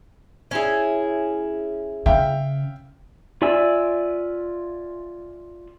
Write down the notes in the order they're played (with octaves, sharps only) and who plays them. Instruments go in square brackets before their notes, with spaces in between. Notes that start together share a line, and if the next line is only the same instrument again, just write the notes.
[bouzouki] C#4 E4 G#4
[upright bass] C#3 [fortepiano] E5 F5 G5
[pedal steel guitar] F4 D5 E5 G#5 E6